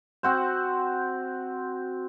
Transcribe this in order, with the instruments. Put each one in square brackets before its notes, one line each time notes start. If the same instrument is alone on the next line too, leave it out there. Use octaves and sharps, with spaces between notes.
[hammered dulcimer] C4 F#4 C5